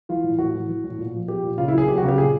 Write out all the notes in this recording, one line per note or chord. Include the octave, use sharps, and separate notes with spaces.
E3 F4
A2
A2 F#4
E3
E3
A2
A#2
F3
F3 G4
A#2
C#3 F4
E4
F#3 G#4
F#3 G4
F#4
C#3
G4
A#2 G#4